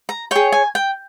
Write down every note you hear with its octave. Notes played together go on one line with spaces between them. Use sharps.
A#5
G#4 C#5 G5
G#5
G5